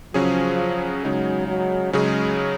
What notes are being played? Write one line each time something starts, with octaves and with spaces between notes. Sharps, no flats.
C#3 F3 F#3 C#4 G#4
C#3 F#3 G#3 D#4 G#4
F#3
C#3 F#3 G#3 C#4 G#4